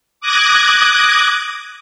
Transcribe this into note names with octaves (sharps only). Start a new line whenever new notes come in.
D6 D#6 F#6 G#6 A#6